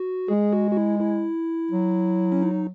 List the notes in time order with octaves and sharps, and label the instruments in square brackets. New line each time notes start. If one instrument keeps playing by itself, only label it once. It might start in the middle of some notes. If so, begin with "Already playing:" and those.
Already playing: [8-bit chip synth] F#4
[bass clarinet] G#3 [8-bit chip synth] G#4
[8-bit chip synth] F#4
F#4
E4
E4
[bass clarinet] F#3
[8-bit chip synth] C#4
D#4